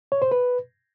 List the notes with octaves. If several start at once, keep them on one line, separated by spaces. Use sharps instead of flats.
C#5
C5
B4